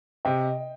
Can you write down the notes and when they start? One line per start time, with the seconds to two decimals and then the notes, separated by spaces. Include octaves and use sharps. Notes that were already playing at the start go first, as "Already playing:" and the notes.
0.25 C3 D#5 G5